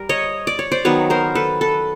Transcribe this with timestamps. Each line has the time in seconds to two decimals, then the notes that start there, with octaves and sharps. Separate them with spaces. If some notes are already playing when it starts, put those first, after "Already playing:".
Already playing: G3 A#4
0.09 C#5 D#5
0.47 D5
0.59 C#5
0.72 C5 D5
0.85 D#3 F#3 B3 B4 C#5
1.10 A#4 C5
1.35 A4 B4
1.61 A4 B4